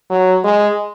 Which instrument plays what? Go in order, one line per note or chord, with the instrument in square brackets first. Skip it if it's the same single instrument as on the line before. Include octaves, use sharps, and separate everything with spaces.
[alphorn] F#3
G#3